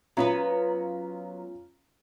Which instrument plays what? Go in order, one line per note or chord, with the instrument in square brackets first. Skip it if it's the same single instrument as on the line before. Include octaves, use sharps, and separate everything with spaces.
[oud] F#3 B3 B4 [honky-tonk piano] C#4 F4 A#5